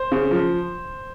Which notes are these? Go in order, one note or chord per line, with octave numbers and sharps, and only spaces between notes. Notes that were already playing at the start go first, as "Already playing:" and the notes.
Already playing: C5
C#3
F3